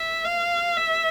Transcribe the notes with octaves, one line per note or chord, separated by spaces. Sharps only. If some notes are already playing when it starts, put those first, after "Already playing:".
Already playing: E5
F5
E5